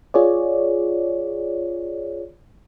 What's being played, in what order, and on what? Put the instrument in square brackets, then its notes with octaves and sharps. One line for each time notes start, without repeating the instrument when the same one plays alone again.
[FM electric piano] F4 G#4 C#5 D5